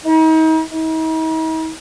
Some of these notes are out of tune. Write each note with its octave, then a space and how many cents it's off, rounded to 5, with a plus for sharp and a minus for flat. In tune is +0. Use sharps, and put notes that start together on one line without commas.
D#4 +40
D#4 +45